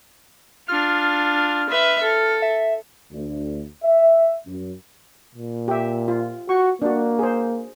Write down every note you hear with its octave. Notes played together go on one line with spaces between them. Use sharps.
D4 F4 F6
B4 E5
A4
E5
D2
E5
F#2
A#2
G4 E5
F4
F#4 C#6
A#3 D4 F#4
G#4 C5